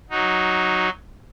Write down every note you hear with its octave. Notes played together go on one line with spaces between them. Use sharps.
F#3 D#4 F#4